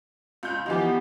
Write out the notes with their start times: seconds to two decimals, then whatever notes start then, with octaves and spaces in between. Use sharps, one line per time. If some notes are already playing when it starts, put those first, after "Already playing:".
0.43 C#2 G6
0.66 E3 F3 B3 D#4 G4